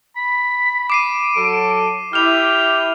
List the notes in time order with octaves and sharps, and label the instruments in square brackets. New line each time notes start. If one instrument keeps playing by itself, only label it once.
[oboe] B5 [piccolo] B6
[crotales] D6 C7 D#7 [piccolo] D7
[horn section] F#3 A4
[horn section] E4 [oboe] G4 [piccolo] D6 [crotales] F6 F7